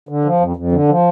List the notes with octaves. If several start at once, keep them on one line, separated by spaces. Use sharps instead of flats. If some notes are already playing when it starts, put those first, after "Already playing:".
D3
F3
F2
F2
D3
F3